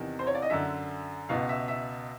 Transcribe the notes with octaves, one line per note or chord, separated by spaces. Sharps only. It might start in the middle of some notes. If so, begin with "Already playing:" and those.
Already playing: E2 C3 D#3
C5
C#5
D5
D#5
F#2 D3 E5
C#2 B2 F5
E5
E5